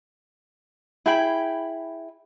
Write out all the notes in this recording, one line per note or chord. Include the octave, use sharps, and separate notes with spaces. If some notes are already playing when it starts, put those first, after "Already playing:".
E4 G#4 G5 B5